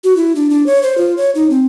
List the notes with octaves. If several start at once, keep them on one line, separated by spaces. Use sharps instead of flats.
F#4
E4
D4
D4
C#5
C5
F4
C#5
D#4
C4